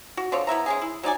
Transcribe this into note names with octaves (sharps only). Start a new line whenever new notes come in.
F#4
D3 F3 C4 C#5
B3 E4 E5 A#5
G#3 C#4 G#4
E4
F#3 D#4 D5 G#5